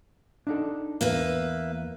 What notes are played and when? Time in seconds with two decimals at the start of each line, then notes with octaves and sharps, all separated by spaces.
0.47 D4 D#4 A4
1.01 E2 A#3 B4 E5